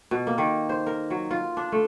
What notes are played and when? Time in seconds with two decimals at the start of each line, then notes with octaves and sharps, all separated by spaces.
0.11 B2
0.27 A#3
0.38 D#3
0.69 C5
0.87 A#4
1.10 F#3
1.31 F4
1.57 D4
1.72 A3